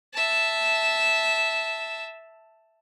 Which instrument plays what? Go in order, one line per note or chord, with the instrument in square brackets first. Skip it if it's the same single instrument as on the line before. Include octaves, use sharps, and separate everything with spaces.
[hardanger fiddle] E5 A5